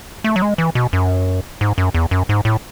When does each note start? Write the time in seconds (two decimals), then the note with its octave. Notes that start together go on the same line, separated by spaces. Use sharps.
0.24 A3
0.36 F#3
0.42 G#3
0.58 E3
0.75 B2
0.93 F#2
1.61 G#2
1.78 F#2
1.94 E2
2.11 F#2
2.29 G#2
2.45 A2